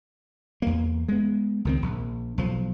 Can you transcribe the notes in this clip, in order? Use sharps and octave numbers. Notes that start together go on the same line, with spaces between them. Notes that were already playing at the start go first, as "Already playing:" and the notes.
E2 A#3
G#3 B3
C#2 D#3 C4
A#1
B1 F3